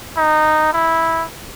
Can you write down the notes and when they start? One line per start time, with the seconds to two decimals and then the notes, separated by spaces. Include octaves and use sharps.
0.17 D#4
0.73 E4